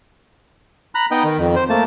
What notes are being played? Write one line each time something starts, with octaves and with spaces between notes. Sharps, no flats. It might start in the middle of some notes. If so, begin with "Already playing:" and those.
A#5 B5 F#6
B3 D#4 D#5 G5
D#3
F2
C5
A3 A#3 A5